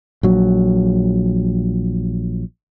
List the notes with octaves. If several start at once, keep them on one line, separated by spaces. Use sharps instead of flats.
A#1 F#3